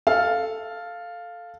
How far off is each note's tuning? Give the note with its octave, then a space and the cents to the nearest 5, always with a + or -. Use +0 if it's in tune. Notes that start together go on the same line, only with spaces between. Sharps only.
A4 +0 F5 +0